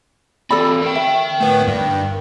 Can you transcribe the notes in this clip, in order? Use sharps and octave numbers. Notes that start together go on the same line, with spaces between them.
E3 C4 A4 D5 B5
A#4 G5
E5
A2 B3
G2